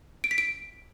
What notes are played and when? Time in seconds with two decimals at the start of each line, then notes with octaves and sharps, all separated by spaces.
0.24 D7
0.31 B6
0.38 D7